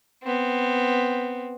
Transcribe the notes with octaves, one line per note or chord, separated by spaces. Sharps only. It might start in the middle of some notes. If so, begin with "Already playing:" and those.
B3 C4